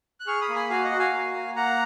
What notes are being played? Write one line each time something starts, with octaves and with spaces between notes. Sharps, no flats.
F#6
G#4 C#6 F6
B5 D#6
A#3
G#5 B5
F#4 F5 G#5
D#5 F#5
F#4
F5 G#5
A#3
A#3
A#3 F#5 A#5